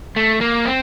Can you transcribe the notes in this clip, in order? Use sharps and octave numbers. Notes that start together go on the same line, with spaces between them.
A3
A#3
C4